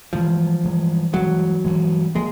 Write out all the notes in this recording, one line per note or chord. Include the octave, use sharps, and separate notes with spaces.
G2 E3 F3 G#3
G2 E3 G#3
G2 E3 F#3 G#3
G2 E3 G#3
F3 G#3 A#3